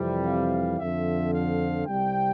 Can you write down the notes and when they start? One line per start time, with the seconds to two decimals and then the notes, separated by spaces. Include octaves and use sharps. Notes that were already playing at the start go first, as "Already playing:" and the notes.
Already playing: F2 C3 E3 G3
0.25 F5
0.79 F2 D3 F3 E5
1.33 F5
1.85 C2 C3 G3 G5